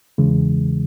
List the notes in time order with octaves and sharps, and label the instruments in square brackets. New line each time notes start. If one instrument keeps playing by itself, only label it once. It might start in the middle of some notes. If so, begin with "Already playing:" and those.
[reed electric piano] E2 C#3 E3 G#3